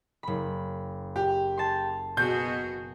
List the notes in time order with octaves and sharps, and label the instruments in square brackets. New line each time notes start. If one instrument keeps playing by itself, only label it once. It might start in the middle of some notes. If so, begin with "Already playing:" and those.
[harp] F#1 B5
[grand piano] G4
[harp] A5 C6
[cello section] B2 F#4 G#4 [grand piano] G6